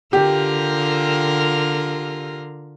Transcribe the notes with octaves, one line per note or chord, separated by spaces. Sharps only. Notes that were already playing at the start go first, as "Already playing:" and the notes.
D3 F4 G4 A#4